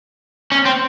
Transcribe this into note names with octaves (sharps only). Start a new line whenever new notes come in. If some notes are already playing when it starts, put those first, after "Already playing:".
C#4
C4